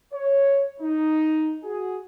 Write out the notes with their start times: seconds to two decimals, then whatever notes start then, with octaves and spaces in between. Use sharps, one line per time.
0.13 C#5
0.80 D#4
1.64 F#4 G#4